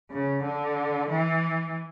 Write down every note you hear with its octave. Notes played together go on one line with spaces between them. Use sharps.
C#3
D3
E3